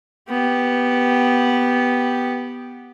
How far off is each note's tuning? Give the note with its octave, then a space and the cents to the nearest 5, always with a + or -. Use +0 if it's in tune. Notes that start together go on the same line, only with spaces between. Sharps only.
B3 +0 G4 +0